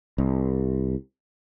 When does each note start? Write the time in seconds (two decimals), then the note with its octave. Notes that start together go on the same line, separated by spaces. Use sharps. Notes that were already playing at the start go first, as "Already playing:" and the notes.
0.18 C2